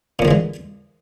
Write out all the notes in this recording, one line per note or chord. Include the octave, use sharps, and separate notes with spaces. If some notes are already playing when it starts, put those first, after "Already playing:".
F2 A#2 D3 E3 G#3